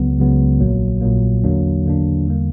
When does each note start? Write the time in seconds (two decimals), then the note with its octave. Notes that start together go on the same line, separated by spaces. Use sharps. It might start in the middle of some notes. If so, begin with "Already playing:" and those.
Already playing: C#2 C#3 F#3 B3
0.19 C#2 C#3 F#3 B3
0.60 A#1 A#2 F#3 A#3
1.01 A#1 A#2 F#3 A#3
1.44 E2 D3 F#3 A#3 D4
1.85 E2 D3 F#3 A#3 D4
2.26 E2 D3 G3 A#3